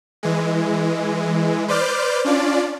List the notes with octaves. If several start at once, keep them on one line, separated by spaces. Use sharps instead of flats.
E3 G#3
B4 C5 D5 D6 F6 G6
C#4 D4 F4 D5